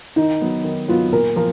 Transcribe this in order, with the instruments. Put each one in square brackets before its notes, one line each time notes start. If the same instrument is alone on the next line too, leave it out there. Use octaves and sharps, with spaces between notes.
[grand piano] D#3 [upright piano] D#4
[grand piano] F#3 B3
D#3
[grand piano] F#3 B3 [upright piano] F4
[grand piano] A#2 [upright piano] A#4
[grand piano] F3 [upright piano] A#4